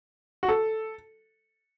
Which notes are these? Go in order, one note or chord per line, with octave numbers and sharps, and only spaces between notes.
F#4
A4